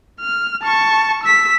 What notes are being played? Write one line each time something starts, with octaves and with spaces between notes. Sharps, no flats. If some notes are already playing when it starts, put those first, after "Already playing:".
F6
A5 C#6
E6 B6